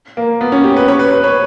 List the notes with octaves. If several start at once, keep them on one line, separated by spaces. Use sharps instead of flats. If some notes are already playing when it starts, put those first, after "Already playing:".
A#3
B3
C#4
G4
B4
C#5
B4
B4
C#5